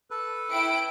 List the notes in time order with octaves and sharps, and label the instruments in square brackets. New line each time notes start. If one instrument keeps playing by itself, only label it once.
[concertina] A4 B4
[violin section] E4 G5 D7